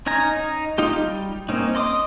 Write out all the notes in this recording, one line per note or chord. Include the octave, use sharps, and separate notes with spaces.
C#4 D#4 G#5 A#5
D#4
D#4 F4 G4
G3
A#3 C4 C#4 D#4
D#5 C6 D6 D#6